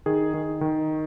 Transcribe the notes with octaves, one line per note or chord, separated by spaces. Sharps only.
D#3 G#4
D#3
D#3